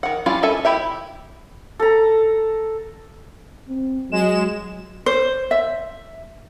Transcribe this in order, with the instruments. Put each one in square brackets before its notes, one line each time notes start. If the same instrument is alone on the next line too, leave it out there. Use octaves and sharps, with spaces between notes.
[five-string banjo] D#3 F#5
G3 C#4 E4 F4 F5
C#4 A4 E5 G#5 A5
E4 G4 E5
[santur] A4 A#5
[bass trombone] C4
[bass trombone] F#3 [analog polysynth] G#3 E7
[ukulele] C5
E5